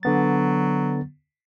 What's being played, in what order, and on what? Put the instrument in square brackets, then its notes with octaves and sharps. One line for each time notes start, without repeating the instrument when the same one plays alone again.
[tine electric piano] D3 B3 A6 [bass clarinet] F#3